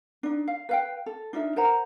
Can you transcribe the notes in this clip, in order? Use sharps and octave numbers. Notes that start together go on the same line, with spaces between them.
D4 D#4
F5
B4 F5 G5
A4
D4 D#4 F4 E5
A#4 C5 F#5 A#5